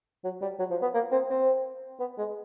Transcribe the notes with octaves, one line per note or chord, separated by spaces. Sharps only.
F#3
G3
F#3
F3
B3
A#3
C4
C4
B3
G#3